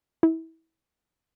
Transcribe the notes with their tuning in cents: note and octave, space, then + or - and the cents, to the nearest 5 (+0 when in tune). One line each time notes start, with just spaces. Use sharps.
E4 -25